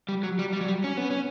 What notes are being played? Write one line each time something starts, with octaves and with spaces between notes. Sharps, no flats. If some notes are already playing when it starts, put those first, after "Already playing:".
G3
F#3
G3
G3
F#3
G3
C#4
B3
C#4